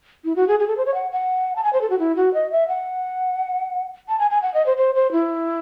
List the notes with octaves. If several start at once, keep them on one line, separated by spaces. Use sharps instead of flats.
E4
F#4
G#4
G#4
A4
C5
C#5
F#5
F#5
A5
G#5
C5
A4
F#4
E4
F#4
D#5
E5
F#5
A5
G#5
G#5
F#5
D#5
C5
C5
C5
E4